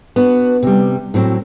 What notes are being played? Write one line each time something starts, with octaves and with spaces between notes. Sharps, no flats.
B3 D4 F#4
C3 G3
A2 F#3 C4